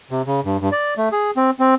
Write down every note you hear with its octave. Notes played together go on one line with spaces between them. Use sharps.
C3
C#3
G2
G2
D5
A3
G#4
C4
C4